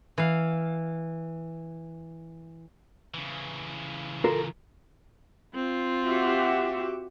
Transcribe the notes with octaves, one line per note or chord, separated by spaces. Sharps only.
E3 F5
C#3 E3
F4 A4 A#4
C4 F4
F#4 G4 E5